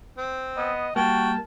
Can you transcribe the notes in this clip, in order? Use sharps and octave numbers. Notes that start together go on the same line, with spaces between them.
C4
B3 D#5
G3 A#3 F#4 G5 A5